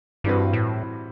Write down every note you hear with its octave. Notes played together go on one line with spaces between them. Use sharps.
G2 E3 G3 C4 F#4 B4
A2